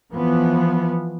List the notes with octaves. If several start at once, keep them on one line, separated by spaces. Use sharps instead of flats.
E3 F3 B3